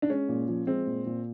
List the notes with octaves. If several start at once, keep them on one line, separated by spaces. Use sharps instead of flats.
D4
G#3 C#4
A#2
F3
G#3 C4
A#2
A#2